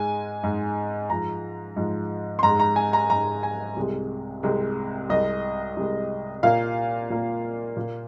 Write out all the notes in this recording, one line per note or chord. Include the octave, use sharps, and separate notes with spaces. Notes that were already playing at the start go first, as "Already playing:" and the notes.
Already playing: G#2 G#3 G#5
G#2 G#3
G#2 F3 G#3 A#5
G#2 F3 G#3
C6
G#2 G#3 A#5
A#5
G#5
A#5
G#2 G#3 A#5
G#5
C2 C3 G#3
C2 C3 G#3
C2 C3 G#3 D#5
C2 C3 G#3
A#2 A#3 F5
A#2 A#3
A#2 A#3